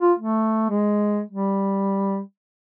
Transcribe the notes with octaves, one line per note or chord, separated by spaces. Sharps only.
F4
A3
G#3
G3